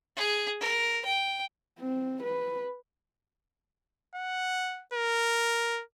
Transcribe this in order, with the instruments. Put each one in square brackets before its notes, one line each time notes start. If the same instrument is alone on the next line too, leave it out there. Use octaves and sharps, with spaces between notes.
[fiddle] G#4
A#4
G5
[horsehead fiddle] C4
B4
[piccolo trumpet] F#5
A#4